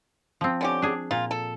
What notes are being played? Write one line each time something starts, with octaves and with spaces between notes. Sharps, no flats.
F3 C4
D3 C#4 G4
D4 G#4
A#2 F4
A4